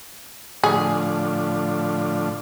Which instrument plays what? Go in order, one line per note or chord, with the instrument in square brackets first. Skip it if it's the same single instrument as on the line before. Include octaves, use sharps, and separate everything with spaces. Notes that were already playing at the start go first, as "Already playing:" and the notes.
[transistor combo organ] A2 D3 F3 [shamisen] G#4